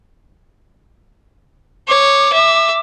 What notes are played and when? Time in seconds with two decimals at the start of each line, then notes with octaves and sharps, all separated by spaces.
1.88 C#5 D6
2.33 E5